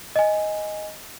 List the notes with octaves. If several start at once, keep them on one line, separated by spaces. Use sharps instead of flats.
D#5 G#5